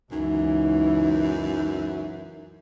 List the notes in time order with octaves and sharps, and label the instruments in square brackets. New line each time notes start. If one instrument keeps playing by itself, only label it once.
[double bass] C#2 E3 [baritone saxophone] F#2 [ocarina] D#4